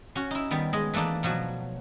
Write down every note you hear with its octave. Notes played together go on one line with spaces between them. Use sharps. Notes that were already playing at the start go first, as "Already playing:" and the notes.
C#4 F#4
D#4 E4
D#3 G3 B3
G#3 D#5
E3 A3 A#3 D4 D#4
B2 F3 F#3 F#4